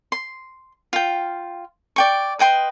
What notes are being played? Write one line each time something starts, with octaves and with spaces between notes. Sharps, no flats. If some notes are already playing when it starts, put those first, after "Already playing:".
C6
F4 G5
D5 G5 C#6
B4 D#5 G5 C6